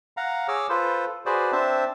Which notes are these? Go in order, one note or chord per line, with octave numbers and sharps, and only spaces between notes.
F5 F#5 A#5
G#4 C#5 D6 E6 F6
F4 A4 B4 C5
F#4 G#4 B4 C5 D5
C4 D4 C5 E5 A5